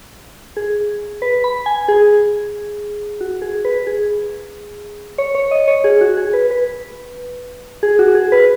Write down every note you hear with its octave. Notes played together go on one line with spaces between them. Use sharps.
G#4
B4
B5
G#5
G#4
F#4
G#4
B4
G#4
C#5
C#5
D#5
C#5
G#4
F#4
G#4
B4
B4
G#4
F#4
G#4
B4